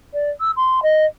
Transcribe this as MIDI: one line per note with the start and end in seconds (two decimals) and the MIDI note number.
0.13 0.29 74
0.40 0.51 88
0.56 0.80 84
0.82 1.05 75